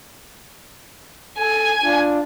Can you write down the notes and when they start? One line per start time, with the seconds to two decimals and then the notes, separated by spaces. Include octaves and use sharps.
1.38 A4 G#5 G#6
1.83 D4 F4